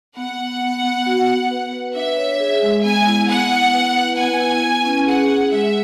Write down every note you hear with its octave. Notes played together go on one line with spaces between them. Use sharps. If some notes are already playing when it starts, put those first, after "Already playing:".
B3 F#5
B3
B3
B3
F#4
B3
B4
B4
D4 E5
C#5
G#4
G#3
B3 G#5
E4
B3 F#5
E4
B4
B4
B3 G#5
E4
B4
C#4
G#4 F#5
G#4
G#3 E5